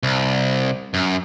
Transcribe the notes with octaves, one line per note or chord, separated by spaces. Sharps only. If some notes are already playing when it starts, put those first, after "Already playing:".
C2
F#2